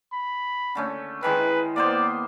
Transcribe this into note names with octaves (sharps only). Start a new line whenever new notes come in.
B5
D3 A3 C#4
D#3 E3 G#3 B4
A#3 B3 C5 D5